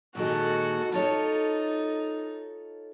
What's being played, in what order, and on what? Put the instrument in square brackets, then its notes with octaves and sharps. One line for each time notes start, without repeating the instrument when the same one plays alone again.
[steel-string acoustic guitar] A#2 D#3 G#3 [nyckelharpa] F#4 A4
[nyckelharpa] D#4 [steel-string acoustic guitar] F4 A4 C#5